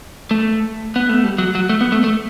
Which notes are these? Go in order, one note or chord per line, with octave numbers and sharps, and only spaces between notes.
A3
B3
A3
G3
F#3
F#3
A3
B3
A3
A3